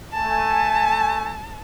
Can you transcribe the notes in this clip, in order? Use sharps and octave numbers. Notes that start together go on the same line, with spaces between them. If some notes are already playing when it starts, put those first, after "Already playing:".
A3 G#5 A5